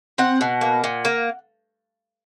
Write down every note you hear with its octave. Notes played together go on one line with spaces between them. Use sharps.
C4 F#5
B2
A#3
A#2
A#3